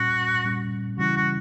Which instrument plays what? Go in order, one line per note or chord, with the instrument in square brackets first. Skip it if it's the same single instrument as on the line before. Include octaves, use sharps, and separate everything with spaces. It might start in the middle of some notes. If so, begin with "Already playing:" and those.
Already playing: [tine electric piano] A#2 G3 C#4 [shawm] F#4
[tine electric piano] A#2 G3 C#4
[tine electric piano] C#3 E3 G3 C#4 E4 [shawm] F#4
[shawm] F#4